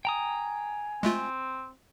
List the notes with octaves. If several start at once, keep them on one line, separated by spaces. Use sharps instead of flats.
G5 G#5 A#5 D#6
G#3 A3 C4 F4